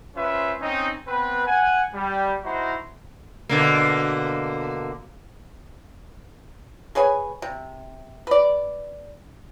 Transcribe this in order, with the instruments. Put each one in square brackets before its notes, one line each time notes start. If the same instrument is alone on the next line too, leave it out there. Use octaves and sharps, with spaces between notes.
[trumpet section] C#4 F4 B4 C5 E5
C4 C#4 D#4
B3 C4 B4
F#5 G#5
G3
D#4 E4 F#4 C5 A#5
[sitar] B2 D3 A#3
[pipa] G#4 B4 C#5 G#5
C3
B4 D5